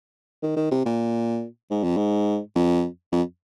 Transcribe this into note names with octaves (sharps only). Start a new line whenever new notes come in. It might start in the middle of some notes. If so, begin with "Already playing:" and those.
D#3
D#3
C3
A#2
G#2
F2
G#2
F2
F2